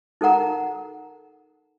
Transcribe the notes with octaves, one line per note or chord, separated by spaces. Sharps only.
D#4 A4 A#4 F#5 A#5